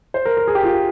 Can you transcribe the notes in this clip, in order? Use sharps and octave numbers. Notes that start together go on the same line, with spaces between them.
C5
A#4
A#4
G#4
G4
F4